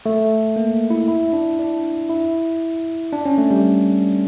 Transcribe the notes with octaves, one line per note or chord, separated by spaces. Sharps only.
A3
A#3
E4
E4
D4
D4
E4
D4
C#4
A3
G3